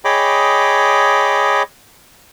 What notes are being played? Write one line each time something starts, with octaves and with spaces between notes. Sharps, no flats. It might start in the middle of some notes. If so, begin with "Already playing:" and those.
G#4 C#5 D#5 G5 B5 D6